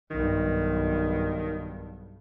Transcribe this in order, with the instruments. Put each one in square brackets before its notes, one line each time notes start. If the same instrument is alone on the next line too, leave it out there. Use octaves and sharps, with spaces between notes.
[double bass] B1 G2 [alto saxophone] D#3